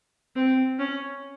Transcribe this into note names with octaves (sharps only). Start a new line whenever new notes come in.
C4
C#4